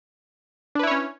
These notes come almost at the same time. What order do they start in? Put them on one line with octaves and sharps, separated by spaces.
D4 B4 E4 C#5 C#4